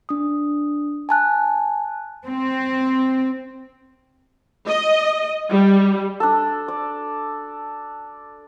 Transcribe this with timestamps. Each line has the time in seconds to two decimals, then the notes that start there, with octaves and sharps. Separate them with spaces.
0.09 D4 D#6
1.09 G#5 A5 F#6
2.27 C4
4.66 D#5
5.51 G3
6.20 D4 A4
6.68 D5